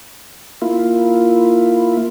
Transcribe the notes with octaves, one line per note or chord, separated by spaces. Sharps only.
A#3 E4 F4